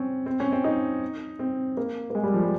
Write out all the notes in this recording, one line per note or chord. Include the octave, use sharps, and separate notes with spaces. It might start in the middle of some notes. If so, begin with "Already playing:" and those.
Already playing: C4 C#4
C4
C#4
C4
D#4
C4
A#3
A#3
G#3
G3
F3
G3